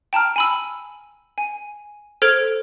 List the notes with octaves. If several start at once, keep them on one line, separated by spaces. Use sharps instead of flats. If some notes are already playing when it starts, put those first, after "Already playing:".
G5 A5 A#5 F6
G#5 B5 E6
G#5
A4 C5 F6 G#6 D7 F7